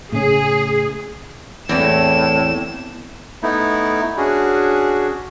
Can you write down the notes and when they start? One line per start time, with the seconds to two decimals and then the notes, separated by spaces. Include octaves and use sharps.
0.12 A2 C#3 C#4 G#4
1.69 E2 A2 C4 E7
3.43 A3 B3 D#4 E4
4.17 C#4 D4 F#4 G#4